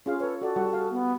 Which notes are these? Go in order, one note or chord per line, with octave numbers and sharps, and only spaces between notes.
C#4 F4 G#4 F5
A4 B4 C#5
F#4 A4 D5
G3 F#4 F#5
F#4 G#4 F5
B3